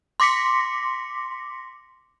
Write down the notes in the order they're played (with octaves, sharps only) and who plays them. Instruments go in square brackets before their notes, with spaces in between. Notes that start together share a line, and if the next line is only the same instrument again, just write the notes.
[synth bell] C6 D6 A#6 B6 C#7